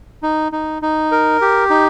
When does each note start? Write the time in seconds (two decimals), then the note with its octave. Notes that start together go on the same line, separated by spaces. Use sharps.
0.23 D#4
0.52 D#4
0.82 D#4
1.12 A#4
1.41 G4
1.70 D#4